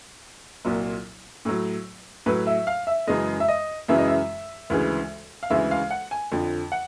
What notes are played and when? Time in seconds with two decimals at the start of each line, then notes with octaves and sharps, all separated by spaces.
0.65 C2 A#2 F#3
1.45 A2 F#3
2.26 A2 F#3 B4
2.47 E5
2.67 F5
2.87 E5
3.07 F#2 C#3 E3 G#3 D#5
3.40 E5
3.48 D#5
3.88 F#2 C#3 E3 G#3 E5
3.98 D#5
4.07 E5
4.70 D2 C#3 E3 G#3
5.43 F5
5.50 D2 C#3 E3 G#3 E5
5.71 F5
5.90 F#5
6.11 G#5
6.32 F2 D3 F3
6.72 F#5